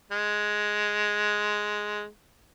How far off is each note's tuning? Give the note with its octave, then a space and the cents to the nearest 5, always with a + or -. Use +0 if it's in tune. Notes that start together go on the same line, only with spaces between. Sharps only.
G#3 +5